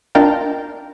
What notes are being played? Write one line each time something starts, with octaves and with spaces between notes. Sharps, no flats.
D4 D#4 F4 A#4 G5 A5